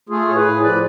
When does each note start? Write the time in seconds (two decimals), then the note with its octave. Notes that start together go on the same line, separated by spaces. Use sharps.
0.09 A3 F4 G#4
0.28 A2 C#5
0.36 G#4 B4
0.45 A2
0.63 F3 B4 D5